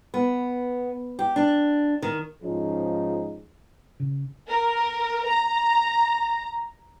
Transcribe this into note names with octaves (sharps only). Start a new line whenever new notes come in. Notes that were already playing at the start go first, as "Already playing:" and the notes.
B3
G4
D4
D#3
G#2 F3 C#4 D#4 G#4
C#3
A#4
A#5